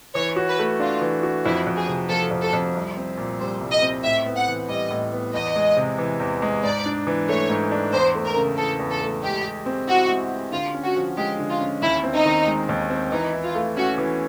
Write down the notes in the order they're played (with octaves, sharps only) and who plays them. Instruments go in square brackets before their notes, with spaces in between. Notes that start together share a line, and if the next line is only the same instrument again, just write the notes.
[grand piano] E3 [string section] C#5
[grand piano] F#4
[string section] B4
[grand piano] A3
[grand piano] D4 [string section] F4
[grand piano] E3
F#4
[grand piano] F2 [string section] E4
[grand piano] F2
[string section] G#4
[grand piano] C3
[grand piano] F3 [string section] A4
[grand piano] F2
[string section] A4
[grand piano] F2
C2
C4
A#2
[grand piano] G3 [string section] C5
[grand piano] C2
[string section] D#5
[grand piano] C4
[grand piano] A2 [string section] E5
[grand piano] B3
[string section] F#5
[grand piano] E3
[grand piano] G3 [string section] D#5
[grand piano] A2
B3
[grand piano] E2 [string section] D#5
[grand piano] G#3
C3
E3
E2
G#3
[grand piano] G#2 [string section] D5
[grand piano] D4
E3
[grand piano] A3 [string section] C#5
[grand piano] G#2
D4
[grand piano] E2 [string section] C5
[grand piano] A3
[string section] A#4
[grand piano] C#3
[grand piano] E3 [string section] A4
[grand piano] E2
[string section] A4
[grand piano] A3
[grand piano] G#3 [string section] G4
[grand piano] G4
C4
[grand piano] E4 [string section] F#4
[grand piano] G#3
G4
[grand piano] D3 [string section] F4
[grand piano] C#4
[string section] F#4
[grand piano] F3
[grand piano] G#3 [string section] G4
[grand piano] D3
[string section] F4
[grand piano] C#4
[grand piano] D#2 [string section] E4
[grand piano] C4
[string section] D#4
[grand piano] D#3
G#3
D#2
C4
[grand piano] E3 [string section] D#4
[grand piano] E4
[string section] F4
[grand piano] A3
[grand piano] C#4 [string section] F#4
[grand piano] E3